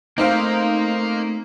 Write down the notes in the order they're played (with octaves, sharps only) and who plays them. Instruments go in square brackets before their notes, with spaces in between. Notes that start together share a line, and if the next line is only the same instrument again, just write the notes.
[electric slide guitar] A3 C4 [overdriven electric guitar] A#3 [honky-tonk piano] D#4 C5 F5